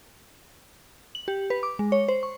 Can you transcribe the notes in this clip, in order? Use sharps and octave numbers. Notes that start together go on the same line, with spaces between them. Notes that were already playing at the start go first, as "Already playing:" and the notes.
F#7
G4
B4
D6
G#3
C#5
C5
C#6